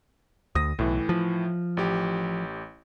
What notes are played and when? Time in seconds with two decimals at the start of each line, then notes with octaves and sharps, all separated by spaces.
0.55 D2 D#6 A#6
0.79 B1 A2 E3
1.09 F3
1.77 A1 G4